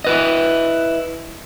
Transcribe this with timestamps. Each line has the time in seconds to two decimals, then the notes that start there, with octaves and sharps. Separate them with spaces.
0.04 E4 B4 D#5